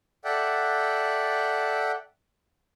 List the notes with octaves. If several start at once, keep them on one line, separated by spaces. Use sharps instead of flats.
A4 D5 E5 F#5 G5